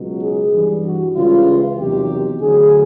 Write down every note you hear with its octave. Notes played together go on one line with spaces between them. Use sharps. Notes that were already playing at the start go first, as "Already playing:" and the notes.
Already playing: C#2 B2 F#3
G#4
G2 E3 G3
F#4
C#2 C#3 E3 G3 F4
E2 C3 D#3 F#3 G4
D2 D3 F#3 G#4